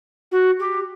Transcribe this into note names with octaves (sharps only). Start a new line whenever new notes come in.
F#4
G4